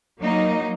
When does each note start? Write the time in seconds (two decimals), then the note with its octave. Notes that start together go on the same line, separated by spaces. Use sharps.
0.21 F#3 A#3 D#4